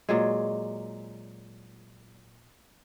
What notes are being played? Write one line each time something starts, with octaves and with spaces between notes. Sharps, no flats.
A#2 F#3 G#3